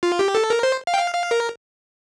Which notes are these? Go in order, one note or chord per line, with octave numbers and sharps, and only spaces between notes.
F4
G4
A4
A#4
C5
F5
G5
F5
F5
A#4